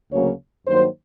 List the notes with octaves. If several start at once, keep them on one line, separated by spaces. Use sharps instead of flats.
D2 C#3 F#3 A#3 C#4 C#5
G2 D#3 F#3 A#3 C5